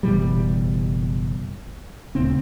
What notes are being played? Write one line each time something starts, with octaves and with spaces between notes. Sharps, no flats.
F#1 B2 E3 G3
D#1 D2 C#3 C4